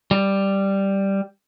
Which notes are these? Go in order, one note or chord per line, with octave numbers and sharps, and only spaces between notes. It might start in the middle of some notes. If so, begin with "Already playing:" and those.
G3